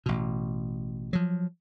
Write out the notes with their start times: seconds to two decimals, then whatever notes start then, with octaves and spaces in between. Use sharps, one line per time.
0.06 A1 B2
1.13 F3 F#3